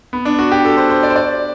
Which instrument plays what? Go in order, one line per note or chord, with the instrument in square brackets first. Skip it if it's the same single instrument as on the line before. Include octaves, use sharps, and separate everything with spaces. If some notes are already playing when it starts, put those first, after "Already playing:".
[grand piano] B3
D4
F#4
G4
A4
C5
C5
D5
C5
D5